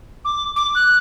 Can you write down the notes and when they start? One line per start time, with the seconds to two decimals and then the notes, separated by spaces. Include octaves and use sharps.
0.25 D6
0.56 D6
0.75 F#6